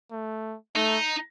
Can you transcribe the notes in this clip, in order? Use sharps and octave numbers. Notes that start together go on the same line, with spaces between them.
A3
A3 D#4